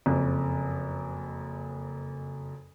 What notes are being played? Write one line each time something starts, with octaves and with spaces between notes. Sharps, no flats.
F#1 F2